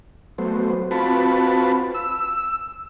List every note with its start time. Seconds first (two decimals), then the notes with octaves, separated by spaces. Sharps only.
0.38 F#3 A3 B3 C5
0.91 C4 F4 F#4 B4 A5 B5
1.95 E6